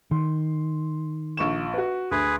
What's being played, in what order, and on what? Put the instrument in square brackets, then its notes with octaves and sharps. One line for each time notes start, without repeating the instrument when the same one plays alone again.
[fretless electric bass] D#3 [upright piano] C6
[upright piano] A#1 C#6 E7
F#4 B4
[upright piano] D2 [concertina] G#4 B4